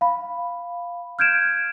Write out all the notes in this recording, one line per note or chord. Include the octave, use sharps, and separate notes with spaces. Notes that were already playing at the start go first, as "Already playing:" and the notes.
F5 B5
F6 G6 G#6 D7 E7